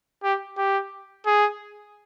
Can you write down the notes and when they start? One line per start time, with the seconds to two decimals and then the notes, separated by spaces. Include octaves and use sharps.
0.24 G4
0.58 G4
1.26 G#4